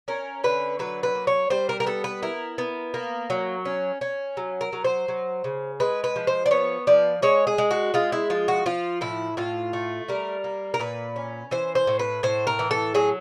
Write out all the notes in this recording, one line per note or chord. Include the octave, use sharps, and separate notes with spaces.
C#4 A#4
D3 B4
F#3 B4
B4
A#3
C#5
G3 C5
A#4
A#4
B3 A4
B4
E4 A#4
B3
A#3
F#3
C#4
C#4
F#3
A#4
F#3
C5
F#3
C#3
G#3 B4
B4
F3
C5
D5
B3 C#5
F3 D5
G#3 C#5
G#4
G#3
F#4
G#3 F4
E4
F3 F4
F#4
F3 F4
A2 E4
A2 F4
A3
G3 A#4
A#3
A#4
A#2 B4
C#4
E3 C5
C5
A2
B4
A2 C5
A#4
E3
A4
F#3 G#4